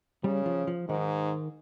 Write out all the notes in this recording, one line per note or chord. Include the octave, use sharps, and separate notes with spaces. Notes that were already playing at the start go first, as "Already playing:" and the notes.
C#3 G3
F3
F3
G#2 D#3